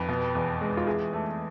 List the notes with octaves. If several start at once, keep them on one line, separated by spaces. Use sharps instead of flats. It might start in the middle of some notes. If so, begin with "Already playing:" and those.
Already playing: F2 B4
B2
E2
G#3
F4
E3 G#4
A3